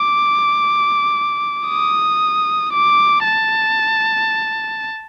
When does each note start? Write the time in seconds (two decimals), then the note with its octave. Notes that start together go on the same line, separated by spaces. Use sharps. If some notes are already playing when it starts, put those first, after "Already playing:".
Already playing: D6
1.68 D#6
2.73 D6
3.24 A5